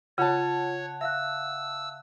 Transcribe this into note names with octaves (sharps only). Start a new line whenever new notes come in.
C#3 F4 C#5 F#5 A5
E5 F5 E6 F#6